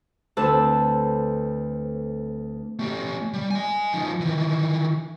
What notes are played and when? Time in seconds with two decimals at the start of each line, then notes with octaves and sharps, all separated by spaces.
0.37 D2 A3 C4 B4 A5 E6
2.79 A3 G4
3.34 G3
3.51 D#5 G#5
3.94 F3 D#4
4.21 D#3 E3